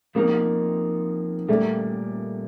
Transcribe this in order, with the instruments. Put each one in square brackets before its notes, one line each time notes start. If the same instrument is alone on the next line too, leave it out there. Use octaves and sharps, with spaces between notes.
[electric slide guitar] F3 C4 D#4 [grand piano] A#3
[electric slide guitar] A#2 G3 A#3 [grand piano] A3